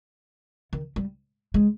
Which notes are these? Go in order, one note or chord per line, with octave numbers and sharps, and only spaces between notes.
D#3
G3
G#3